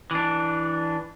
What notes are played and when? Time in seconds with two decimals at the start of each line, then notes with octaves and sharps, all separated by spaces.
0.11 E3 D4